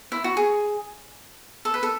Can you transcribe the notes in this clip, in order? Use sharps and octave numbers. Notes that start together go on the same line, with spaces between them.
E4
F#4
G#4
A4
B4
A4